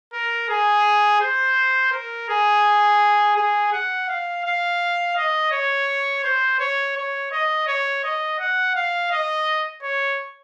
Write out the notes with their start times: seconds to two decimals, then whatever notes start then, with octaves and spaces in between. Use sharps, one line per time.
0.13 A#4
0.49 G#4
1.21 C5
1.92 A#4
2.29 G#4
3.36 G#4
3.72 F#5
4.08 F5
4.45 F5
5.16 D#5
5.52 C#5
6.24 C5
6.59 C#5
6.96 C#5
7.31 D#5
7.67 C#5
8.04 D#5
8.39 F#5
8.75 F5
9.11 D#5
9.82 C#5